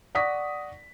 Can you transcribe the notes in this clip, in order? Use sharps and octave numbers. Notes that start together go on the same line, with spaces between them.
D5 F#5 C#6 D#6 A#6 B6